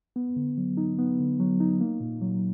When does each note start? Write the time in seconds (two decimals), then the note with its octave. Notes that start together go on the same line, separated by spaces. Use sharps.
0.16 B3
0.36 D3
0.58 F#3
0.77 D#4
0.99 B3
1.19 D3
1.40 F#3
1.60 D#4
1.81 A#3
2.00 A#2
2.21 F#3